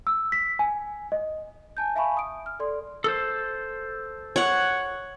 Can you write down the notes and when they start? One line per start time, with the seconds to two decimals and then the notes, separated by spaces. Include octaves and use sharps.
0.07 E6
0.32 B6
0.59 G#5
1.12 D#5
1.77 G#5 A5 G6
1.95 E5 F5 G#5 A5 B5 C#6
2.17 D#6 D7
2.46 F6
2.59 A4 D5 C6
3.04 A4 C5
4.36 C#5 F#5